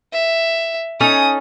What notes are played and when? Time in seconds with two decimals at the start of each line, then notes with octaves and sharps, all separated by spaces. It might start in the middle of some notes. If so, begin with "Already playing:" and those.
0.13 E5
1.01 C#4 D#4 A4 D#6